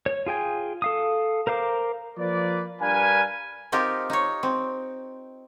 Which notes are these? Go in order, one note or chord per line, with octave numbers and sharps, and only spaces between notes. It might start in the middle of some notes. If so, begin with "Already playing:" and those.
C#5
F4 G#4 G5 G#5
A4 F5 D#6
A#4 C5 F5 D6
F3 A#3 B4 D5
G2 D4 A#4 B4 F5 G#5
C4 D#4 F4 G4 A#4
D#4 C#5
C4